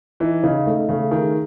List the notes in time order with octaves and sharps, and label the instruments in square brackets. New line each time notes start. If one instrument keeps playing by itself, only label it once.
[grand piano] E3 [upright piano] D#4
[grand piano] C#3 [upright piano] D#4
[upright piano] A3
[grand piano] C#3 [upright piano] A3
[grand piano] D#3 [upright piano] G#4